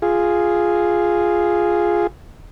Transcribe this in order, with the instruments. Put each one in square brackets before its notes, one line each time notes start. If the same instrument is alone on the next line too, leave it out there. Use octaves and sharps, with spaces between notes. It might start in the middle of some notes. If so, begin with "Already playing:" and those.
[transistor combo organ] F4 G#4